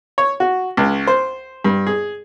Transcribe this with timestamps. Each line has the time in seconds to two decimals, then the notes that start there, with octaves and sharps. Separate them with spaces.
0.18 C#5
0.40 F#4
0.77 C#2
1.07 C5
1.65 G2
1.87 G#4